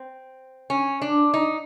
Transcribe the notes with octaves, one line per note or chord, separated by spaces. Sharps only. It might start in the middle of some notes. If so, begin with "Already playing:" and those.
Already playing: C4
C#4
D4
D#4